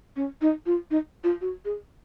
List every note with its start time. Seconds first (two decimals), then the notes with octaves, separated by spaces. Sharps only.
0.16 C#4
0.41 D#4
0.66 F4
0.91 D#4
1.24 F4
1.41 F#4
1.65 G#4